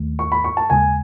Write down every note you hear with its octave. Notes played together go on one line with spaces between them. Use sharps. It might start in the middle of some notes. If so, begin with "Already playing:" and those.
Already playing: D#2 D#3 A3
C#6
B5
C#6
A5
D#2 C#3 G#3 G#5